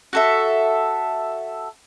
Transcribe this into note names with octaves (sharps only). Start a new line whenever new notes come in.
F#4 A4 E5